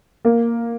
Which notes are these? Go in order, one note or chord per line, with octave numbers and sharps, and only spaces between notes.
A#3